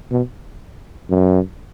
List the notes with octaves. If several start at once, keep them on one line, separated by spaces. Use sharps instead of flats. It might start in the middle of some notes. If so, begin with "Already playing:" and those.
B2
F#2